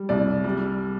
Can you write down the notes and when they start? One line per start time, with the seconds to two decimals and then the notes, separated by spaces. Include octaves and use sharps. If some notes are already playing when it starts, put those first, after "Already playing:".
Already playing: G3
0.09 C2 D5
0.44 G3